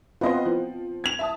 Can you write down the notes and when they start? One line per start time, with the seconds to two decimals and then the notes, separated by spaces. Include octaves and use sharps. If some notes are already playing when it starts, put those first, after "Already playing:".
0.21 B3 C4 F4 B4 D#5 C6
0.46 F3
1.04 G#6 F7
1.19 E5 A5 D#6